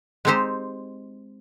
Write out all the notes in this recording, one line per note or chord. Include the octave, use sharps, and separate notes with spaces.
G#3 C4 D#4 G4 C5